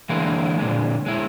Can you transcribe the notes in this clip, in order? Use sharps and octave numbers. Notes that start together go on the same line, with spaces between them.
D3 E3 G#3 A#3 E4
A#2 D3 G#3
G#3 E4